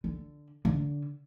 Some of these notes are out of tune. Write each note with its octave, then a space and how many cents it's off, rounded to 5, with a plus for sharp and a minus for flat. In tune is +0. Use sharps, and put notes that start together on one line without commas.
D3 +5
D3 -20